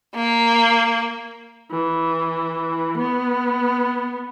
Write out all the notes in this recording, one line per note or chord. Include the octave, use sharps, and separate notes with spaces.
A#3
E3
B3